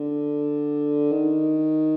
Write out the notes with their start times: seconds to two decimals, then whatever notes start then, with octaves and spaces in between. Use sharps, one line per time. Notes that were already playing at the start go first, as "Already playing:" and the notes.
Already playing: D3
1.11 D#3